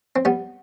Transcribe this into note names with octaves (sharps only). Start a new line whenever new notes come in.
C4
G3 B3